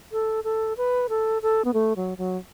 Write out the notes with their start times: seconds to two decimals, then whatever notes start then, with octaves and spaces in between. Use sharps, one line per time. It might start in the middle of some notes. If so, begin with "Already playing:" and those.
0.12 A4
0.44 A4
0.77 B4
1.09 A4
1.42 A4
1.65 B3
1.74 A3
1.96 F#3
2.18 F#3